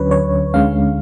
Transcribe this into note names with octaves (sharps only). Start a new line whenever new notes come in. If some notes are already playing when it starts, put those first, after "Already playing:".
Already playing: D2 D3 F#3 C#4 B4 C#5
C#5
D2 D3 G#3 C#4 F5